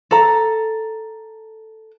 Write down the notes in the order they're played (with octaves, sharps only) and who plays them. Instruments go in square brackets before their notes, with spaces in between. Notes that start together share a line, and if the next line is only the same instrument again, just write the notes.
[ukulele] A4 A#5